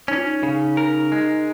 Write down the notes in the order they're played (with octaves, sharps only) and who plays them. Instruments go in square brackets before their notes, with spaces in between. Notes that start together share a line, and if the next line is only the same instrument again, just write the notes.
[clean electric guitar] C#4 [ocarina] D#4
[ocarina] F4
D#4
[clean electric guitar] C#3
A#4
G#3